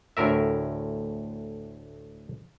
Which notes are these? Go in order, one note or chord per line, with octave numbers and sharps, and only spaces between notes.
D2 A2 A#4 E5